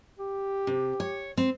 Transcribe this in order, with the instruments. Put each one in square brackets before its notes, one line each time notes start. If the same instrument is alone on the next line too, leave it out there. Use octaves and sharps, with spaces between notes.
[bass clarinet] G4
[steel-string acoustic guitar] C3
C#5
C4